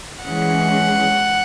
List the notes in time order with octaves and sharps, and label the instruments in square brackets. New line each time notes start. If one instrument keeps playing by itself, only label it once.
[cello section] E3 G#3 C#4 G#4 [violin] F#5